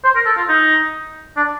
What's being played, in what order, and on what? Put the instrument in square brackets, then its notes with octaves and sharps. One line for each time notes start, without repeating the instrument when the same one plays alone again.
[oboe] C5
A#4
A4
F4
D#4
D4